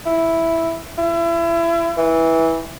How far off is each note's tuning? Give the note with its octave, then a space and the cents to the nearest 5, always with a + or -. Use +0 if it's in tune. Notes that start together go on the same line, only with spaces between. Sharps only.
E4 +0
E4 +30
E3 -15